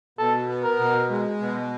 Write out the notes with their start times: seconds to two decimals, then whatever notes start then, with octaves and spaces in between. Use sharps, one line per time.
0.19 B2 A4
0.48 B3
0.64 A#4
0.79 B2
1.10 G#3
1.39 B2